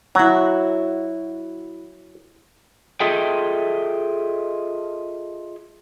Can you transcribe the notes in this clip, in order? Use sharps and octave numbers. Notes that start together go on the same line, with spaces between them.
F#3 E4 F#4
F4 G#4 A4 D#5 E5 G5